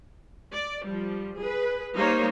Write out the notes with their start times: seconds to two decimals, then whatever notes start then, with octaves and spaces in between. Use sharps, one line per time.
0.52 D5
0.85 F3 G3
1.38 G#4 B4
1.94 G3 A#3 D#4 C5 C#5